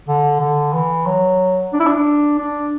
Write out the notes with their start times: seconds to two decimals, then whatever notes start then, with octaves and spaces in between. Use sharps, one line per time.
0.08 D3
0.40 D3
0.73 E3
1.06 F#3
1.73 D4
1.80 E4
1.87 D4
2.39 D4